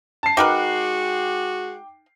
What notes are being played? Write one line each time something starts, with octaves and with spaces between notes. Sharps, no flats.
A5 C7
G#3 D#4 F#4 A#4 B4 G5 D6